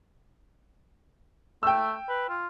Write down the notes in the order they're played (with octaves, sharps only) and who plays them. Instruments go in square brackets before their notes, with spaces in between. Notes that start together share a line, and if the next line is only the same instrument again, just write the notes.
[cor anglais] A3 [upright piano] G5 E6
[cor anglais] B4
F4